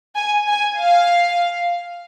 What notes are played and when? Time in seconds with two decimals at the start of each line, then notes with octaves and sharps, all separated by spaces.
0.16 G#5
0.47 G#5
0.79 F5